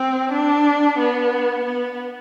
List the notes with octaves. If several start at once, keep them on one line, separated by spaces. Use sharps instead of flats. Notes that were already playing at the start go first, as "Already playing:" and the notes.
Already playing: C4
D4
B3
B3